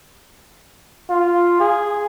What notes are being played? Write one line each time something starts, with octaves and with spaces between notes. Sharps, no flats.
F4
G#4